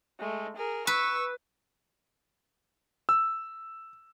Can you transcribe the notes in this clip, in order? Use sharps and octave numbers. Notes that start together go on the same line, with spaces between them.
G#3 A3
G#4 A#4
B4 C#6 E6
E6